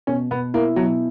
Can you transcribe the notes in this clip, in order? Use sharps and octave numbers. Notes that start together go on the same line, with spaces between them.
B2 C#4
B2 B3
A#3 E4
B2 F#3